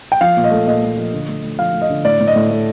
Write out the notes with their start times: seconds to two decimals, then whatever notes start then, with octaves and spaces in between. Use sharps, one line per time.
0.12 G5
0.21 F3 F5
0.37 A#2
0.44 D#5
0.51 A3
0.67 A#2 D#5
0.83 A3
0.97 F3
1.13 D3
1.29 A3
1.43 A3
1.59 F3 F5
1.74 A3
1.82 D#5
1.90 D3
2.05 A2 D5
2.20 A2
2.27 D#5
2.36 A2
2.50 A3